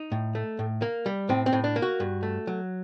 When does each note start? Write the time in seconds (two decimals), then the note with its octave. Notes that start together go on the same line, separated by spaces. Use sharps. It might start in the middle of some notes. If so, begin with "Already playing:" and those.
Already playing: D#4
0.12 A2
0.35 A3
0.59 A2
0.82 A#3
1.06 G3
1.29 A2 C4
1.46 C4
1.53 A2
1.64 D4
1.76 A#3
1.82 F#4
2.00 G2
2.23 A3
2.47 F#3